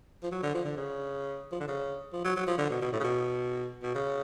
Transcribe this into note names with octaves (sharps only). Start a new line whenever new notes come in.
F3
F#3
D3
F3
D3
C#3
F3
D3
C#3
F3
F#3
F#3
F3
D3
B2
B2
A2
C#3
B2
B2
C#3